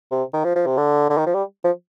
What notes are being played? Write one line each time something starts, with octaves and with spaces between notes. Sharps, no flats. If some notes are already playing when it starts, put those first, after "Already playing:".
C3
D#3
F3
F3
C3
D3
D3
D#3
F3
G3
F3